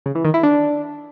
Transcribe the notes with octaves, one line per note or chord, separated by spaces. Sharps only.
C#3
E3
D#3
E4
D4